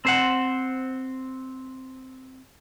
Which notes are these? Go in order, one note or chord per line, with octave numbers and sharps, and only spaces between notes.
C4 C5 F#5